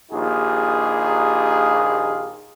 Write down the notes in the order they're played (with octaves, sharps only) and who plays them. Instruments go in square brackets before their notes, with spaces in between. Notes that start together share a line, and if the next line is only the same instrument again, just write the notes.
[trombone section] A#1 D#2 D#4 F4 G4 G#4